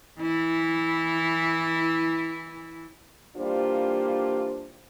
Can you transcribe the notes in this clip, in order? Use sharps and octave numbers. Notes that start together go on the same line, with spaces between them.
E3 E4
E3 G3 A#3 D4 F4 C5